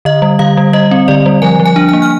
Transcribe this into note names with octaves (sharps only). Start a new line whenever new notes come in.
D3 D#5
G3
D3 F5
G3
G3 D#5
C4
D3 D5
G3
F3 G#5
F3
G#5
D4
A#3 G#5
F6